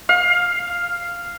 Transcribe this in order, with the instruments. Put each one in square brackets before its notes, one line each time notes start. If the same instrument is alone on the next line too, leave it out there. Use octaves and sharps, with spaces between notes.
[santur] F5